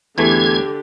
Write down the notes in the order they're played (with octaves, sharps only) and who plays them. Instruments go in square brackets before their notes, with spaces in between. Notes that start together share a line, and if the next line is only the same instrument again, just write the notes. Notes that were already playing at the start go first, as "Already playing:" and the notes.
[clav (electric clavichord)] E2 E3 A3 [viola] D3 A4 [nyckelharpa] G4 [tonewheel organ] G#6